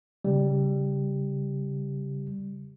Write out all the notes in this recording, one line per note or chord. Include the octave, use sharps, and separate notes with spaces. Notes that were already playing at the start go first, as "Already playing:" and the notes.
C#3 G3